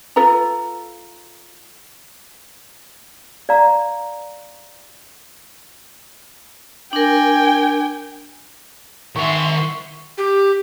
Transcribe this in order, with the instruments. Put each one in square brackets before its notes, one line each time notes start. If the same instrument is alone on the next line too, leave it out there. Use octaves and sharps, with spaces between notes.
[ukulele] F4 A4 B4 A#5
[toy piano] D5 F5 A#5
[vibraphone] D4 A#4 [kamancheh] G5 G#5
[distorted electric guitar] D#3 G#5 [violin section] E5 F#5 C6 [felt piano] C#6
[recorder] G4